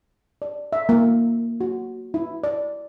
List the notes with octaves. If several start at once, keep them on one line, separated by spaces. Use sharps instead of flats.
D5
E5
A#3
F#4
E4
D5